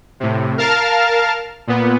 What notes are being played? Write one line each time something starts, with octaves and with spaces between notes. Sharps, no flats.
A2 C3
A#4 F5 A5 F6
A#2 B3